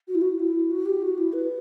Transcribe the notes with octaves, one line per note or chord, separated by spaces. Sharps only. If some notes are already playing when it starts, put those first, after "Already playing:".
F#4
E4
F#4
E4
F#4
G4
F#4
E4
B4